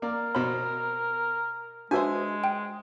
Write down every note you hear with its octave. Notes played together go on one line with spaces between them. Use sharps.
A#3 A#4 D5
B2 C5 B5
G#3 D4 F#4 B4 C5 E5 G#5
G5